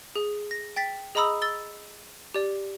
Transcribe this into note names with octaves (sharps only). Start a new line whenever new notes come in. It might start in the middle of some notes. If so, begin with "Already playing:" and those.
G#4
A#6
G5 A6 B6
G#4 D#5 A#5 B5 D#6 E6
E6 A6 G7
G4 D5